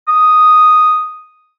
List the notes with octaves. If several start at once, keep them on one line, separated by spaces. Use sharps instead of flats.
D#6